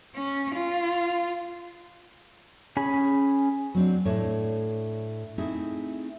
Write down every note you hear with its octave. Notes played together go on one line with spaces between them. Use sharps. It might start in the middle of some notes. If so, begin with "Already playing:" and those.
C#4
F4
C#4 G#4 B5
F#3 C4 D4
A2 D4 A4 C#5
A3 C4 D#4 E4 G#4